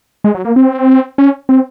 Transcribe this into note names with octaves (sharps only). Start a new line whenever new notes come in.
G#3
F#3
A#3
C4
C#4
C4